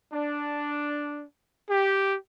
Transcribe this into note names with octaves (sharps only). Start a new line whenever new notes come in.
D4
G4